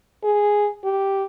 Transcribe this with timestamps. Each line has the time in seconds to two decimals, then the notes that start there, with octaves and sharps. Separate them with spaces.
0.24 G#4
0.84 G4